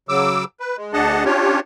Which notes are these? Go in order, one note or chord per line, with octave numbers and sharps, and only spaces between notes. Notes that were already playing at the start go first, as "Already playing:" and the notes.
C#3 F#3 D6 E6
B4
G#3
D2 D4 G#4 D#5 F#5 A5
C#4 D4 F4 G4 C#5